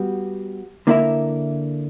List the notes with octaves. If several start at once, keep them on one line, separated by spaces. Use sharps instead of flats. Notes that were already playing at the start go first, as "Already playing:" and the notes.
Already playing: G3 B3 F#4
D3 A#3 E4 A#4 E5